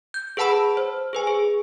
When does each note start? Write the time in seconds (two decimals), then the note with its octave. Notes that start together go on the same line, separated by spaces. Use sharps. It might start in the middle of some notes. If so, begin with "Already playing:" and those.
0.14 G6
0.37 G#4 B4 F#5 A5 B5 E6
0.77 C5
1.13 G#4 B4 G#5
1.27 G#4